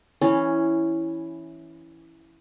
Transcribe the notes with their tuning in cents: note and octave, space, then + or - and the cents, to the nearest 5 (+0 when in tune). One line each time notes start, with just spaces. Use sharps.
E3 +0 C#4 +0